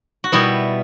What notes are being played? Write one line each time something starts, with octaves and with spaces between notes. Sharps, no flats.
F#4
B2 G3 B3 E4